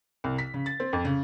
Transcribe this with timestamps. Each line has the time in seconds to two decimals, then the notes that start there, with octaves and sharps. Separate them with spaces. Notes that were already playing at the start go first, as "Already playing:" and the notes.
0.24 C2
0.38 B6
0.54 C#3
0.66 A6
0.80 C4
0.93 F2
1.05 C#3